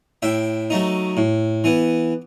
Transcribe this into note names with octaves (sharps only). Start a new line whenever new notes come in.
A2 E5 G5
F#3 A3 D#4
A2
E3 B3